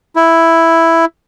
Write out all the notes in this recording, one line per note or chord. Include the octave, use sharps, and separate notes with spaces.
E4